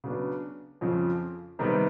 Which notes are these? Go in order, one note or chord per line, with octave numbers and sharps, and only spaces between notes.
C#3 F#3 B3 D4
F2 C#3 F3
C3 D#3 G3 B3